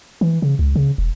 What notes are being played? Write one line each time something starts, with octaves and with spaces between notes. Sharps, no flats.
E3
C#3
C#2
C#3
E1